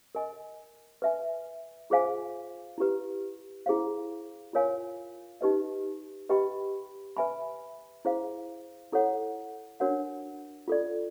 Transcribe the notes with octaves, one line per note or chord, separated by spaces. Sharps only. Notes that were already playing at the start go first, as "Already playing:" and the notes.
A#4 D#5 G#5
B4 E5 G#5
F4 G#4 C5 F5 G#5
E4 G4 B4
E4 G#4 C5 F5
F4 A#4 C#5 F5 G#5
D#4 G4 B4 D#5
G4 B4 D#5 G5 B5
B4 E5 G#5 B5
E4 G#4 C5 F5
E4 A4 C#5 F#5
D4 F#4 A#4 C#5 F#5
F4 A4 D5